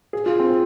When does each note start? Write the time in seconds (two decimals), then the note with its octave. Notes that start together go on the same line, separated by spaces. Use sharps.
0.13 G#4
0.26 F4
0.40 C4